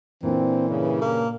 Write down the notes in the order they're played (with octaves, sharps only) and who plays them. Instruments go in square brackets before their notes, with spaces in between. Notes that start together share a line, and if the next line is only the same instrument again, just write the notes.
[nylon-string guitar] A#2 D4 [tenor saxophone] E3 [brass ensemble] C4
[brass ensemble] G2 C#3
[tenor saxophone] A#3